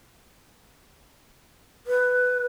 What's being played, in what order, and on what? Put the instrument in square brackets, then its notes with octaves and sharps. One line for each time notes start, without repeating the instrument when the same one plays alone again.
[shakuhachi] B4